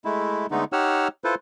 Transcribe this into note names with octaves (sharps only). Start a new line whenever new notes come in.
G#3 A3 E4
D3 G#3 A3 B3 D#4
D#4 G4 C#5 F#5 E6 F6
E4 F4 A4 B4 C5